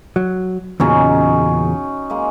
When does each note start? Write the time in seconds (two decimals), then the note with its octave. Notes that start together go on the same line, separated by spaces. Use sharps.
0.16 F#3
0.80 E2 A#2 C#3 F#3 C#4 D#4
2.10 G#3 A#3